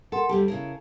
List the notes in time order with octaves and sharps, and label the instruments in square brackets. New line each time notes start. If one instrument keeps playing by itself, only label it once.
[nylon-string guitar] A4 [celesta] A#4 F#5 C6
[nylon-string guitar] D2 G3 G4 [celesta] A5
[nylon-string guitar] C#3 E4 A#4